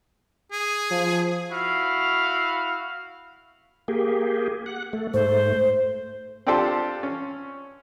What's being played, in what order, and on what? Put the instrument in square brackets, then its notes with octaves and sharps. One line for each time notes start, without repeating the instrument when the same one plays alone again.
[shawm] G#4
[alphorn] F3
[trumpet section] E4 F#4 F5
[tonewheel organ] A#3 G4 G#4
F#5
A3
[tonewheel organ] G#2 A3 [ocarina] C5
[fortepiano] C4 D4 F4 G4 A4 C5
C#4